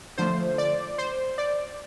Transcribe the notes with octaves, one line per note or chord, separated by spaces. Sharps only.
D3 F3 A3 C5
D5
C5
D5